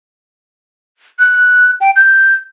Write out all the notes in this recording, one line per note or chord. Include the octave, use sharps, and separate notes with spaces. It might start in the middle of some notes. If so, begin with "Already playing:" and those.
F#6
G5
G6